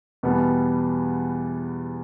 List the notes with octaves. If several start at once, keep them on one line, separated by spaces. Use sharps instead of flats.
E2 B2 G3 B3